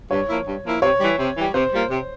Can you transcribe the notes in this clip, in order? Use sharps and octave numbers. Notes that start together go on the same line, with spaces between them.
G2 C#5
F3 A#3 E4
G2
F3 A#3 E4
C3 C#5
E3 G3
C3
E3 G3
C3 C5
G3 A#3 F4
C3